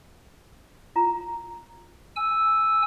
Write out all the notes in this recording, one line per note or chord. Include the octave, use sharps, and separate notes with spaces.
F4 A#5
G#5 E6